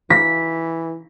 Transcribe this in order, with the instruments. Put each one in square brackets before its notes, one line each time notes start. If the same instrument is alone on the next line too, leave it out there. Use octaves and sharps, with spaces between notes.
[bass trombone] E3 [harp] B6